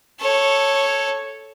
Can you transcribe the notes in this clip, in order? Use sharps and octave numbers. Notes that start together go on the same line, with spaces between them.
A4 C#5